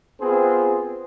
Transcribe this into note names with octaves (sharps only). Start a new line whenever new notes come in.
B3 C4 F4 G#4 B4 C5